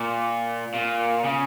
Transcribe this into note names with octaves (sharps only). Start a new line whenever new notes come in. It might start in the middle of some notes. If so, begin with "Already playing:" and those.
Already playing: A#2
A#2
C#3